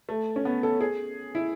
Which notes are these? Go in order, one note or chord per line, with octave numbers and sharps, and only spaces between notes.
A3
C#4
B3
A4
G#4
E4